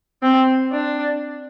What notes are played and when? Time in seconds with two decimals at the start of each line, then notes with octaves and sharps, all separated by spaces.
0.22 C4
0.72 D4